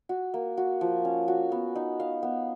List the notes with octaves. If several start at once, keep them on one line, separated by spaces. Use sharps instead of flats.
F#4
A#3
F#4
F3
C#4
F#4
B3
D#4
F5
B3